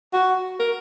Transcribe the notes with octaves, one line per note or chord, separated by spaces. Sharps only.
F#4
A#4